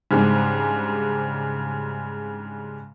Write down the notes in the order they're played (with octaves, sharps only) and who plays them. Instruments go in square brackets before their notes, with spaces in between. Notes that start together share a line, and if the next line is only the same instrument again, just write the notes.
[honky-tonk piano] G#2 C#3 G3 G#3 C4 D4